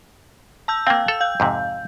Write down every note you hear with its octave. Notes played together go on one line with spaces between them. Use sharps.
A5 E6 G6
A#3 C4 F5 G5
A4 E6
F5 G6
F2 G#2 C3